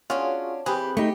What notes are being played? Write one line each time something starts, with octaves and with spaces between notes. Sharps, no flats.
C#4 D4 F4 F#4 G#4
E3 C4 G4 G#4 B4 B5
A3 D#4 G4